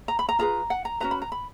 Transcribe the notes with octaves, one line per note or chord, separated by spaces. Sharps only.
A#5
B5
A#5
F4 G#4 B4 A#5
F#5
A#5
C#4 F#4 B4 A#5
B5
A#5
B5